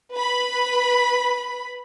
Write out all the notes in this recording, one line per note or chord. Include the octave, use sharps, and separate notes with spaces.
B4 B5